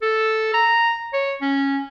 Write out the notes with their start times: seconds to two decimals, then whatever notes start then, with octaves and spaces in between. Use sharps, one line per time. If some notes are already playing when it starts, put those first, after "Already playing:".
0.02 A4
0.54 A#5
1.13 C#5
1.41 C#4